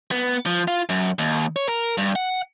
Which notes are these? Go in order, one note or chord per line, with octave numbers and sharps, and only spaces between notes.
B3
F3
F4
F#2
D#2
C#5
A#4
G2
F#5